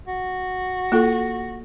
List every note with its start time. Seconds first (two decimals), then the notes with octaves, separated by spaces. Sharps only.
0.07 F#4
0.92 A#3 F4 A4